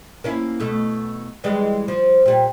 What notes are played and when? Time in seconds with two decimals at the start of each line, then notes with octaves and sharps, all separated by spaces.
0.24 A#3 C#4 E4
0.60 B2 A3
1.44 E3 G3 G#3
1.88 F3
2.26 A#2 G3